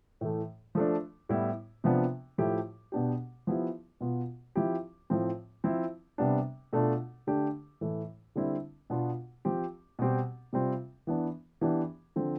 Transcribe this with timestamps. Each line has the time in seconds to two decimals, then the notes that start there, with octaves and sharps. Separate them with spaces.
0.21 A2 E3 A3
0.75 F3 A3 D4
1.29 A2 G3 B3 E4
1.84 C3 F3 B3 D4
2.38 A2 F3 A3 E4 G4
2.92 B2 B3 D4 G4
3.47 F3 B3 E4 G4
4.01 B2 B3 F4
4.56 F3 C4 E4 G4
5.10 A2 F3 C4
5.64 F3 C4 E4
6.18 C3 G3 B3 D4
6.73 B2 A3 D4 F4
7.27 D3 A3 D4 G4
7.81 A2 E3 A3 E4
8.36 D3 G3 C4 E4
8.90 B2 B3 D4 F4
9.45 F3 C4 G4
9.99 B2 G3 C4 G4
10.53 C3 G3 C4 F4
11.07 E3 B3 D4
11.61 E3 B3 D4 G4
12.16 D3 F3 C4